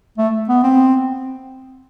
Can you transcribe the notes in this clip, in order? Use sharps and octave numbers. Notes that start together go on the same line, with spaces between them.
A3
B3
C4